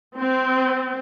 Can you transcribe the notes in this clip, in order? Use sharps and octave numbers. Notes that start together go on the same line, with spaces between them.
C4